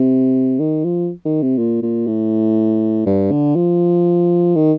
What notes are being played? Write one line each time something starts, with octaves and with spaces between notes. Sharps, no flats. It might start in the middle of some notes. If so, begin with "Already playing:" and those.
Already playing: C3
D#3
F3
D#3
C3
A#2
A#2
A2
G2
D3
F3
D#3